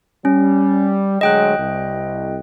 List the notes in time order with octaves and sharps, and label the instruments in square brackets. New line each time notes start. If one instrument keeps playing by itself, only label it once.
[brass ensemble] G3 [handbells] C#4
[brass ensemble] D2 F#3 G#3 [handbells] D#5 G5 F#6
[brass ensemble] C2